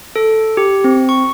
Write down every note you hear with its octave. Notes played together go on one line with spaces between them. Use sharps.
A4
G4
C4
C#6